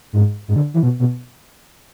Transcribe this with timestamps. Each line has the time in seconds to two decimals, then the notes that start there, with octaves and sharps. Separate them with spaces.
0.13 G#2
0.48 G#2
0.56 D3
0.74 E3
0.83 B2
0.99 B2